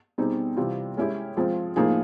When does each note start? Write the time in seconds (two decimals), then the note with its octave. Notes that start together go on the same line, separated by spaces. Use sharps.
0.18 B2 G3 C4 D#4 G#4
0.57 C3 E3 G3 C4 F4
0.97 G#3 C#4 E4 G4
1.37 F3 G#3 C4 F4
1.76 A2 F3 A#3 D#4 G#4